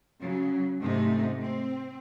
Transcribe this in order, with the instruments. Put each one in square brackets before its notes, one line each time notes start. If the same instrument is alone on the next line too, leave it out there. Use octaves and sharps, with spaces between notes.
[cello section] C#3 F#3
G#2 C3 A3 D#4
C4